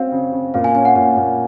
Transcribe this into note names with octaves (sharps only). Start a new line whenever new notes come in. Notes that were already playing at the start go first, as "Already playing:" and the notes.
Already playing: C4 C#4 F#4 F5
C#3
C#3
A#2 F5
G#5
C#4 G#5
F#5
A#2 F#5
A#2